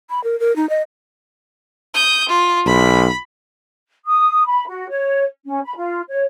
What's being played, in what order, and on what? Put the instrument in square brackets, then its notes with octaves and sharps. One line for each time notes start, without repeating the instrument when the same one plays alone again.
[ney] B5
A#4
A#4
D#4
D#5
[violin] D#6 G6
F4
[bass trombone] B1 [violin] B5
[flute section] D#6
B5
F#4
C#5
C#4
B5
F4
C#5